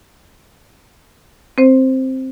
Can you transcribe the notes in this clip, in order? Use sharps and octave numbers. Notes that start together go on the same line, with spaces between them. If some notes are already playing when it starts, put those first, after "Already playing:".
C4 C5